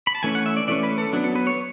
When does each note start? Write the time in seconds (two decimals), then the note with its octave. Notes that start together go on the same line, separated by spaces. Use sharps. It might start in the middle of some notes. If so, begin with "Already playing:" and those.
0.07 B5
0.15 A5
0.23 E3 A3 C#4 G#5
0.35 F#5
0.46 E5
0.57 D5
0.68 E3 A3 C#4 D5
0.83 B4
0.98 A4
1.13 F#3 B3 D4
1.24 A4
1.35 B4
1.47 C#5